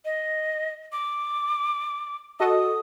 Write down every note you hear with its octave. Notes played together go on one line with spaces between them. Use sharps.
D#5
D6
F#4 A4 D#5 D#6